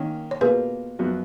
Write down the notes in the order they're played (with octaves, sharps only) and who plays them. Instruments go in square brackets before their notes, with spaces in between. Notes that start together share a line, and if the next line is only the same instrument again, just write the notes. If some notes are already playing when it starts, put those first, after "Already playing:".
Already playing: [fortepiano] D#3 A#3 C#4
[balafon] C#5
[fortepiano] B2 A#3 F4 [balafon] G#4 B4
[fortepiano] F#2 F3 B3 F#4